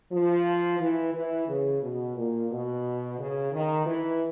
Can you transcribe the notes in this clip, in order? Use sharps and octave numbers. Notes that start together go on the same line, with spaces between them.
F3
E3
E3
C#3
B2
A#2
B2
C#3
D#3
E3